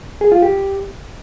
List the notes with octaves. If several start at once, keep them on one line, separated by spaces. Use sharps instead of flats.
G#4
F4
G4